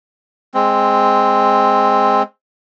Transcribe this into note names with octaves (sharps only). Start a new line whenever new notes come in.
G#3 C4